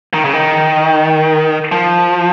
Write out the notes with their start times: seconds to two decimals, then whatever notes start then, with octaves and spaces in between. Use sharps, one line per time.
0.14 D#3
0.25 C#3
0.33 D#3
1.72 F3